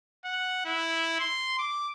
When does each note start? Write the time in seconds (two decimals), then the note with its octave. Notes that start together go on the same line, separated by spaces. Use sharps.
0.25 F#5
0.65 E4
1.20 C6
1.59 D6